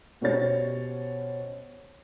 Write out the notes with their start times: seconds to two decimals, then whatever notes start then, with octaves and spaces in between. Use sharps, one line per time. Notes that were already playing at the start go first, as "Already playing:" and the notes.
0.21 B2 C#4 G4 C5 C#5 A6